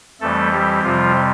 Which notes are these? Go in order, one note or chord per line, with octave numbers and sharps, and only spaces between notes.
F2 E3 G3 A3 A4
G3 G4
F2 C3 F3 G3 F4